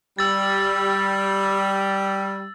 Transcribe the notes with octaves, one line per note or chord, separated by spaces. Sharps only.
G3 E6 A6